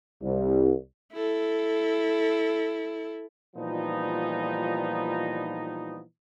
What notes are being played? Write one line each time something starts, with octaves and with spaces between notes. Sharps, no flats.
C2
E4 A4
A#2 E3 F3 G3 B3 D#4